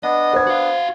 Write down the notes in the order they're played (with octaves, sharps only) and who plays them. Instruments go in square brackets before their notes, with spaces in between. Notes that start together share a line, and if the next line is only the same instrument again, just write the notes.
[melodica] B3 D4 [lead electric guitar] D#5
[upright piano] C5 G#6
[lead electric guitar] F#4 F5